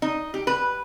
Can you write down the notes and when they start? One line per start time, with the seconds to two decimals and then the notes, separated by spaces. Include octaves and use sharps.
0.02 D#4
0.34 G4
0.47 B4